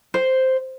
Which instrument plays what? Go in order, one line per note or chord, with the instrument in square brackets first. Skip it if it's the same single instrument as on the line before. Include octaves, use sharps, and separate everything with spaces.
[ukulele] C5